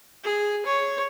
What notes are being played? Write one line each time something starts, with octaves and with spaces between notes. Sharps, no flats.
G#4
C#5